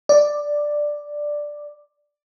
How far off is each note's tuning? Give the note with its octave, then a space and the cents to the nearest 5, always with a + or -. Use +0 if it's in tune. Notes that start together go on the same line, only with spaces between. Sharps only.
D5 +5